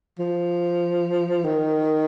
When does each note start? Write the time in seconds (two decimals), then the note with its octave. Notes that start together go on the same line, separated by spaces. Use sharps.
0.19 F3
1.45 D#3